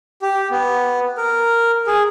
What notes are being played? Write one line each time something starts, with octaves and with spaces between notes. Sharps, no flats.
G4
B3
A#4
G#4